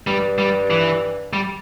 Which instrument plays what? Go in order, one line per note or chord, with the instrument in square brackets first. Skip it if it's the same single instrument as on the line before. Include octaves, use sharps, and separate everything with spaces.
[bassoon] G2 [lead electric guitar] G3
[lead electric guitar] G3
E3
G3